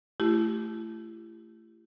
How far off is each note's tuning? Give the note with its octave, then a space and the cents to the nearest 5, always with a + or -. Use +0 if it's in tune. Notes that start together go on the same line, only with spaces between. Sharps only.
A3 +0 E4 +35 G4 +0